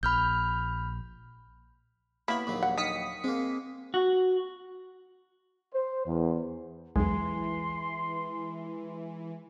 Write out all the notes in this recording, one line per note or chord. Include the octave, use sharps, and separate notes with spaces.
A#1 B5 F6 G6
A#3 B3 E4 C#5 B5
A#1 D#2 F#3
F#5
D#3 D#6 B6 C#7
G#3 A#3 C4
F#4
C5
E2
B1 E2 E3 G#3 C6